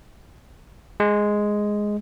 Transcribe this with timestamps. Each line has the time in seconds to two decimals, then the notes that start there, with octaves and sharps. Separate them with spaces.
1.00 G#3